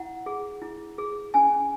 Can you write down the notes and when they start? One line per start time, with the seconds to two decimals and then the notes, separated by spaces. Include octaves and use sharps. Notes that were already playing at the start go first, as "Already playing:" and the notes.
Already playing: E4 F#5
0.26 G#4
0.62 E4
0.98 G#4
1.34 C#4 G#5